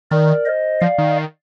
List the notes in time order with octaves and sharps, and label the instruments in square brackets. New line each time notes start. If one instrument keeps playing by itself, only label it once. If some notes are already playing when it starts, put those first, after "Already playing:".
[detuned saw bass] D#3 [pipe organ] A#4 D5
[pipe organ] C5 D#5
[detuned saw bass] F3 [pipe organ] D5 F5
[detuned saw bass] D#3